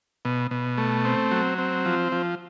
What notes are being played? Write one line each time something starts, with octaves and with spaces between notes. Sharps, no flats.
B2
B2
A3
C4
F#3
C4
F3
F3